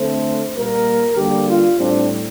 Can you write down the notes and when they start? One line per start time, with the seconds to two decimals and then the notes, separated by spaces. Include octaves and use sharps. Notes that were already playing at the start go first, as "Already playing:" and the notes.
Already playing: D3 A3 C4 C5
0.54 A#2 G3 A#3 A#4
1.16 D3 G3 A#3 G4
1.47 F4
1.78 A2 G3 C4 D4